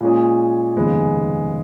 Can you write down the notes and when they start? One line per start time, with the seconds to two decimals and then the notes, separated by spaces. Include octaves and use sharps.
0.01 A#2 G#3 C#4 G#4
0.76 F1 D#2 C#3 G#3 B3